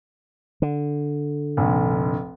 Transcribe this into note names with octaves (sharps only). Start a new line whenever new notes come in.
D3
F1 A#1